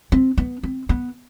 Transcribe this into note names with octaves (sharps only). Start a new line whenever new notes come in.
C4
B3
C4
B3